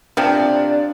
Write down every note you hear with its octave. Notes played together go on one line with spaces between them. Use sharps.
C3 F3 D4